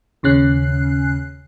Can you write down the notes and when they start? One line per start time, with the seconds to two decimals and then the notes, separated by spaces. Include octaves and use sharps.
0.23 D#2 C#3 C#4 F#6 C7